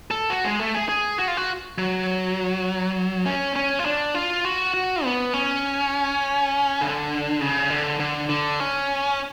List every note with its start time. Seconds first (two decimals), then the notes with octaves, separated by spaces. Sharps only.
0.11 A4
0.30 F#4
0.44 G#3
0.60 A3
0.75 G#4
0.89 G#4
1.19 F#4
1.28 F4
1.37 F#4
1.78 F#3
3.25 C#4
3.56 C#4
3.79 F4
3.86 D4
4.15 F4
4.45 F#4
4.74 F#4
5.04 B3
5.33 C#4
6.81 D3
7.41 C#3
7.70 D3
8.00 D3
8.29 D3
8.60 C#4